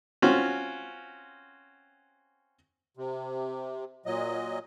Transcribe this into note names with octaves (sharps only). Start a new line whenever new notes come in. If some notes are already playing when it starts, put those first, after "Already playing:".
C4 C#4 F4 F#4
C3
A#2 F#3 D#5